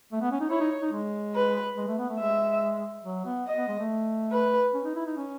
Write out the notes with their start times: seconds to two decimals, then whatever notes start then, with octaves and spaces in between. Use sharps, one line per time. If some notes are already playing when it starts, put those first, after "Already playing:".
0.13 A3
0.22 B3
0.31 C#4
0.41 D#4
0.50 E4 C#5
0.60 D#4
0.82 D#4
0.92 G#3
1.35 B4
1.77 G#3
1.88 A3
1.99 B3
2.09 A3
2.19 G#3 E5
3.04 F#3
3.25 B3
3.47 D#5
3.57 B3
3.68 G#3
3.79 A3
4.32 B4
4.74 C#4
4.85 D#4
4.95 E4
5.06 D#4
5.17 C#4